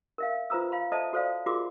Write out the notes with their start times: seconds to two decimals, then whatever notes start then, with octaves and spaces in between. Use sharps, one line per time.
0.18 A#4 E5 F5
0.50 F4 B4 C5 A#5 D#6 E6
0.72 F5 B5
0.92 A4 C5 D#5 E5 A5
1.13 F#4 A4 C5 D5 F5 D#6
1.46 F4 F#4 G#4 A#4 C6 D6